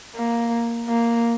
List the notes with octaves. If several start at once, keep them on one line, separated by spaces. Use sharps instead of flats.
A#3
A#3